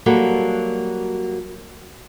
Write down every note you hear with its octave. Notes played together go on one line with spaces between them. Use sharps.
F#3 G3 A#3 F#4 A4